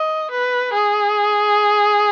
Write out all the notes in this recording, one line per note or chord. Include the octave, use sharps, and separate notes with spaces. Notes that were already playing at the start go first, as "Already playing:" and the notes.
Already playing: D#5
B4
G#4